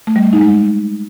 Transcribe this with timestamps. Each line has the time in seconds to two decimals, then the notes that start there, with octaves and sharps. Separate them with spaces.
0.07 A3
0.16 G3
0.24 A3
0.33 D#4
0.41 G#3